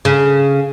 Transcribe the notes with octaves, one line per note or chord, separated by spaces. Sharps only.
C#3